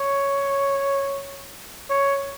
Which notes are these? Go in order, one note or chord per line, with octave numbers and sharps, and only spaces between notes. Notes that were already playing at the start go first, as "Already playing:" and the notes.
Already playing: C#5
C#5